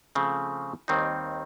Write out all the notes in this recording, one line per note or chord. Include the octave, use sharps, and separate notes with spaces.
C#3 F3 A3 C4
D#2 D#3 G3 C4 D#4